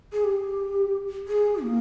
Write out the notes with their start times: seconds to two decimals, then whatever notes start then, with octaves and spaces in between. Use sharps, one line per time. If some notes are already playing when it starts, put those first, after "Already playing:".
0.12 G#4
0.24 G4
1.28 G#4
1.63 A#3